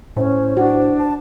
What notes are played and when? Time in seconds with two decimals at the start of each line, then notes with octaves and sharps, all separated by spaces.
0.17 A2 C#4 C5
0.57 D4 F#4
0.99 A5